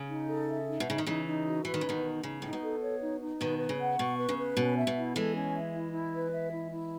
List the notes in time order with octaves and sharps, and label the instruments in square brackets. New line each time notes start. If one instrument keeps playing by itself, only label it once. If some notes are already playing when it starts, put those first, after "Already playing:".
Already playing: [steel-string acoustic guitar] C#3
[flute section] D#4
A4
E5
D#4
[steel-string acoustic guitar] B2
[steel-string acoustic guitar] C#3 [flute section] D#4
[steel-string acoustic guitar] D#3
[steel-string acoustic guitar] C#3 E3 [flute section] D#4
[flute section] D#4
F#4
[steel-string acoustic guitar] E3 [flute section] B4
[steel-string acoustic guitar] D#3
C#3
[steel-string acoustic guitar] B2 D#3 [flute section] D#4
[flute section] D#4
[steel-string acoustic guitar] C#3 [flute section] D#4
[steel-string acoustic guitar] A2 [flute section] D#4
[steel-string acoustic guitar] B2
[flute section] A4
C#5
D#4
D#4
[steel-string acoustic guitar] B2 D#3 [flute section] B4
[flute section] B4
[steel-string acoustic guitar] C#3
[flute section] F#5
[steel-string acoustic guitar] B2 [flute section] C#6
[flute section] B4
[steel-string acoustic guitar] C#3
[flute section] B4
[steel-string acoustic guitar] B2 [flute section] C#4
[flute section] E5
[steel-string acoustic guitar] B2
[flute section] E4
[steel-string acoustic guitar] E3 G#3 [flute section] A4
[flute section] C#4
E5
E4
E4
B4
E5
E4
E4